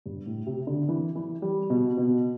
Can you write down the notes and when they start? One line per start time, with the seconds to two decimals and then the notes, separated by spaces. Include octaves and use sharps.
0.06 G2
0.26 A2
0.47 C3
0.67 D3
0.89 E3
1.15 E3
1.42 G3
1.70 B2
1.97 B2